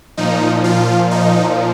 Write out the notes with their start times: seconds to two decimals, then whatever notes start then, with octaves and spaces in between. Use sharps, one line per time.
0.17 A#2 F3 D#4
0.64 F4
1.11 D#4